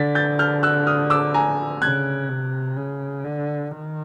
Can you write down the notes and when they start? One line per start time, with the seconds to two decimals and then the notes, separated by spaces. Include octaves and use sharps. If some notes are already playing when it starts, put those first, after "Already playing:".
Already playing: D3 A6 B6
0.15 G6 A6
0.39 F6 G6
0.63 E6 F#6
0.87 D#6 F6
1.10 D6 E6
1.34 G#5 A#5
1.82 C#3 F#6 G#6
2.29 C3
2.76 C#3
3.24 D3
3.71 D#3